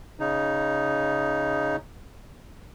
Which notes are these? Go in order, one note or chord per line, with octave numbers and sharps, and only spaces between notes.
C#3 D#4